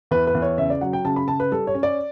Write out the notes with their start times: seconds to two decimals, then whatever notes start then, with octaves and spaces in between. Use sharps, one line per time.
0.11 E2 B4
0.27 B4
0.35 E2
0.42 C#5
0.58 C#3 E5
0.70 D5
0.81 F#3 F#5
0.93 G5
1.05 C#3 A5
1.16 B5
1.28 C#3 A5
1.40 B4
1.52 G3 A4
1.67 C#5
1.75 C#4
1.83 D5